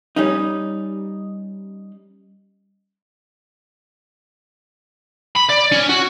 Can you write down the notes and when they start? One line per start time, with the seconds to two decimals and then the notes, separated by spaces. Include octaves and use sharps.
0.16 G3 C#4 D#4
5.35 B5
5.49 D5
5.72 C#4
5.89 F#4